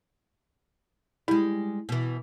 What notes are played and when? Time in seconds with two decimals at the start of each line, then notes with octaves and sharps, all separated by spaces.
1.28 G3 G#3 E4
1.89 B2 E3